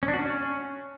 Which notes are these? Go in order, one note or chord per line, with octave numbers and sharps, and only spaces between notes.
C#4
D4
F#4
C#4